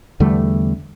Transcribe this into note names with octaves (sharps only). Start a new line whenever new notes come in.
E2 D3 G3 A3